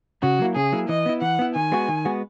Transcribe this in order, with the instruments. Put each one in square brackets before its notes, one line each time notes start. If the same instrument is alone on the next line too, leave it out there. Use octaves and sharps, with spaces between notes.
[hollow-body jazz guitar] C#3 [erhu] F#4
[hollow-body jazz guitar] F#3 A#3 E4
[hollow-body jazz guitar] C#3 [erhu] G#4
[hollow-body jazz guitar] F#3 A#3 E4
[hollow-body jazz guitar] E3 [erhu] D#5
[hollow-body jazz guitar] B3 E4
[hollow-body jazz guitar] E3 [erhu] F#5
[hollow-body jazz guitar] B3 E4
[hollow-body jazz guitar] D#3 [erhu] G#5
[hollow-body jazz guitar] G#3 B3 F#4
D#3
G#3 B3 F#4